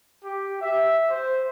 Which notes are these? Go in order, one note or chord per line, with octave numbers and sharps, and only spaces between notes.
G4
E5
C5